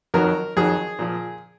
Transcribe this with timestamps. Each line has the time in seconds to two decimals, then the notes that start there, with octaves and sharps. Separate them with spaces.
0.14 F2 D#3 F#3 A#4
0.57 F2 D#3 F#3 G#4
0.99 A#2 F3